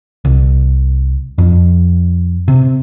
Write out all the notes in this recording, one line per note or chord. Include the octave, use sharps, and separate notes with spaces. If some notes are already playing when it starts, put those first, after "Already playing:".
C2
F2
C3